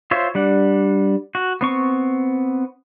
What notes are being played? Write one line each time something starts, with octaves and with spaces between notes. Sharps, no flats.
F4 C5 C#5 E5
G3 D4 F#5
F#4
B3 C4 C#6